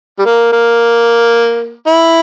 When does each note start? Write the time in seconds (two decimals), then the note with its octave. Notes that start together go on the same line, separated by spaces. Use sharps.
0.19 G3
0.26 A#3
0.53 A#3
1.87 E4